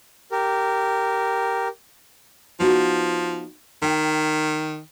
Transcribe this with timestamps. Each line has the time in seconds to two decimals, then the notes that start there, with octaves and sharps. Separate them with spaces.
0.32 G4 A#4
2.60 F3 B3 D#4 F#4
3.83 D#3 G5